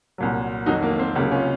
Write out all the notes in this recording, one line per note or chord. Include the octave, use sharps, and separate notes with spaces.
C2 A#2 F#3
F2 D#3 F#3 D#4 F#4
A#3
C4
C#2 C3 F#3 A#3 C#4
C#4 F4